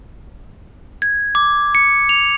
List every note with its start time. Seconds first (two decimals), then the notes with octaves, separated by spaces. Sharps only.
1.02 G#6
1.35 D6
1.75 C#7
2.09 F7